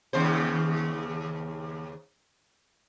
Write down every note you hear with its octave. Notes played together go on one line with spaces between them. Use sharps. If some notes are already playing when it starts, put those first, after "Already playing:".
D#2 C#3 C5